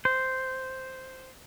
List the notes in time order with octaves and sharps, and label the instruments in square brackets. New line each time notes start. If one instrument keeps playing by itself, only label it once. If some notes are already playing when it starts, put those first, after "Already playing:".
[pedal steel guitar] C5